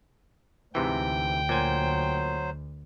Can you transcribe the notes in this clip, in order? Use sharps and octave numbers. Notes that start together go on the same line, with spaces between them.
D2 G#2 C3 E3 G5
A#2 F#3 C5 G#5